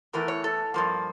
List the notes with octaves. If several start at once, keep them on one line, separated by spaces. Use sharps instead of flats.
E2 E3 A3 A#4
C#5
A4
G2 F3 A#3